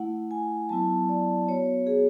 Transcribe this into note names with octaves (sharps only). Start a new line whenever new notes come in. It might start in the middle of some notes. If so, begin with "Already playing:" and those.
Already playing: A3 E4 F#5
G#5
F#3 B3 E4 A5
D5
B3 F#4 C#5
G#4